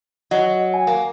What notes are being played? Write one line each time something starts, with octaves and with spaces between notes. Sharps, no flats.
F#3 D#5
G#5
A#3